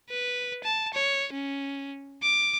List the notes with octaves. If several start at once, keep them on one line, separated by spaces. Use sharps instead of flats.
B4
A5
C#5
C#4
D6